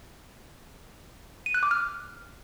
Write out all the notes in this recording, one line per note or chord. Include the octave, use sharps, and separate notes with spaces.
D#7
F#6
D6
F6